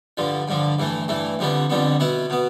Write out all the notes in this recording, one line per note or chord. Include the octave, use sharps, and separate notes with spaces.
G2 D3 F3
G2 D3 F3
G2 E3 A3
G2 E3 A3
F2 D3 G3 B3
F2 D3 G3 B3
B2 B3 E4
B2 B3